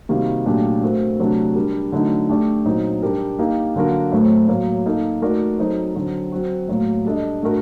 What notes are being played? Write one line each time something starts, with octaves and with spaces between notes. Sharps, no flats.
C3 D#3 G3 A#3 F#4
A#2 F#3 A3 D4 G4
A3 C4 F#4 A#4
C3 F#3 A3 D4 F#4
G3 D4 G4 A#4
D3 F#3 A3 D#4
A3 D4 G4 D5
A#2 F#3 C4 D#4
G3 D4 G4 A#4
A#3 D#4 G4
D3 F#3 A#3 F#4 A#4
A2 F#3 A3 C4 F#4
A2 F#3 A#3
A#3 D#4 A4
A3 D#4 F#4 A#4 D5
F#3 C4 D#4 A4 C5
D3 F#3 C4
F#3 C4 F#4
A2 F#3 A#3
G3 D4 A4 D#5
A2 A3 D4 F#4 A#4